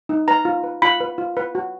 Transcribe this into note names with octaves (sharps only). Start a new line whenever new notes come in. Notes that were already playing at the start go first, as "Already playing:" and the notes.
D#4
B4 A#5
F4
B4
F4 B5
B4
F4
B4
F#4